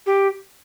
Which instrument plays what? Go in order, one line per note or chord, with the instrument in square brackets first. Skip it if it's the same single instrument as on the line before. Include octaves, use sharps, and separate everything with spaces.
[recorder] G4